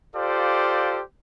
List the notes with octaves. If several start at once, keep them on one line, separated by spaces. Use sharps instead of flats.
F4 G4 A4 C5 D5 F5